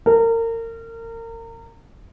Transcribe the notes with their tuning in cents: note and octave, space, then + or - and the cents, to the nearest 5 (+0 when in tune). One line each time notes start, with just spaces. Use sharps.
A#4 -30